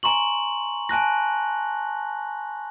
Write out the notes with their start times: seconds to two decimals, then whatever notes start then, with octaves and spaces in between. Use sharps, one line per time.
0.03 G#5 A#5 C6 C#6 F#7
0.89 G#5 A5 F#6 A#6